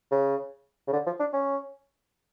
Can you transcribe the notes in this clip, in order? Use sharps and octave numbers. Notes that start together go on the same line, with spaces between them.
C#3
C#3
D3
F3
D4
C#4